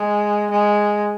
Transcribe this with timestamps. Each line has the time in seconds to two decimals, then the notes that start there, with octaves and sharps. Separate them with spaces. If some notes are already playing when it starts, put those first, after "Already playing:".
Already playing: G#3
0.51 G#3